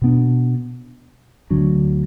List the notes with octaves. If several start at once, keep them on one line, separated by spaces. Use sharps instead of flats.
B2 B3 D4
D2 D3 F#3 D4